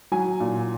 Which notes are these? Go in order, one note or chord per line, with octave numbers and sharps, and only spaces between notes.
F#3 G#5
A#2